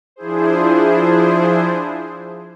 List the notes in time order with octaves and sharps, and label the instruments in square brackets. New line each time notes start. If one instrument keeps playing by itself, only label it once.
[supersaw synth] F3 D4 E4 G#4 C5